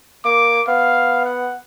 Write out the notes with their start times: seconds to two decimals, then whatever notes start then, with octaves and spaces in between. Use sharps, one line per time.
0.25 A#3 D6
0.68 B3 F5
1.25 F#5